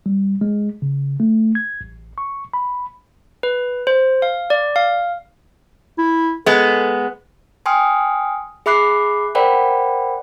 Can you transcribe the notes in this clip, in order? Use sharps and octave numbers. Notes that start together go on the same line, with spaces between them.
G3
G#3
C#3
A3
G#6
A1
C#6
B5
B4
C5
F5
D5
F5
E4
G#3 B3 A4
G5 G#5 C6 D#6 F6
G#4 E5 B5 D6 F#6 C7
A#4 C5 D5 F#5 G5 B5